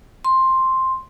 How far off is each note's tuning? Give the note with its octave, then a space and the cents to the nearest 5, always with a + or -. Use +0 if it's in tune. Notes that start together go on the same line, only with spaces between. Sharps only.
C6 +5